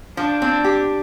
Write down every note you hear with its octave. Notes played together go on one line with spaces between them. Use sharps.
F3 D4
C4
G4